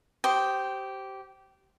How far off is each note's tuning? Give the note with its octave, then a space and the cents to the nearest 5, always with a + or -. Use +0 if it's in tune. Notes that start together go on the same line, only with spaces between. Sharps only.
G4 -20 C5 +0 D#6 -10